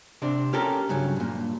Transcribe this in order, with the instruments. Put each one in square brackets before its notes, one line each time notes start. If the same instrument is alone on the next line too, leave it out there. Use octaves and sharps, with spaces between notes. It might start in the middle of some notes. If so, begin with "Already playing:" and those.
[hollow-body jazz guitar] C3 C4 D4
C#4 G4 A4 A#4
G2 C#3 F#3
G2 A#2